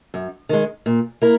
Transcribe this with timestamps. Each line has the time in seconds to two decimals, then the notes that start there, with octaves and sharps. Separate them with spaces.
0.14 F#2
0.49 D#3 G#3
0.86 A#2
1.22 A#3 E4 A#4